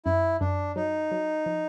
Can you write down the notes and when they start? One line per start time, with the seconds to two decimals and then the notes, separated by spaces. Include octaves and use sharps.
0.05 F#2 E4
0.40 F#2 D4
0.76 F#3 D#4
1.12 F#3
1.46 F3